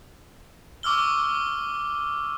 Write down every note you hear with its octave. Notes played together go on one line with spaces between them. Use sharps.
C#6 D6 E6 F6 G7